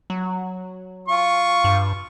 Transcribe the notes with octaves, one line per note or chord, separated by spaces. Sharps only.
F#3
F4 C#6
G2